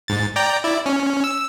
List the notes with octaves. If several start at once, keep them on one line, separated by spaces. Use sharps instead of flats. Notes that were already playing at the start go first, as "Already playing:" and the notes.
G#2 A6
D5 G5 A#5
E4 D5
C#4
E6